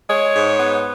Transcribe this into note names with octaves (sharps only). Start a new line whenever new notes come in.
G#3 C#5
G#2
B3